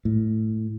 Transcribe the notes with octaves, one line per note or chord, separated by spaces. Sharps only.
A2